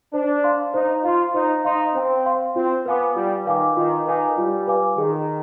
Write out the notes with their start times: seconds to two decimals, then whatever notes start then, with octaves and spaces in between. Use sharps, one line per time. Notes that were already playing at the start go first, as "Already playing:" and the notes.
0.14 D4 C5
0.44 F5 C6
0.74 D#4 C5
1.04 F4 F5 C6
1.34 D#4 C5
1.64 D#4 F5 C6
1.95 C4 C5
2.26 F5 C6
2.56 C4 F4
2.86 B3 B4 F5 G#5 D6
3.16 G3 F4
3.47 D#3 B4 F5 G#5 D6
3.77 D#3 F4
4.07 D#3 B4 F5 G#5 D6
4.38 G3 F4
4.67 B4 F5 G#5 D6
4.98 D#3 G#4